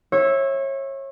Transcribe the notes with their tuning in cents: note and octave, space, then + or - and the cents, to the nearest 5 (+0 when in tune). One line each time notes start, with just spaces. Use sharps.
C#5 -30 E5 +0